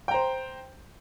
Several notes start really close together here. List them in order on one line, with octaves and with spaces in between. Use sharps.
G5 A#5 C5